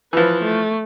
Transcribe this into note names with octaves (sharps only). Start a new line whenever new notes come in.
E3 F3 B4
A3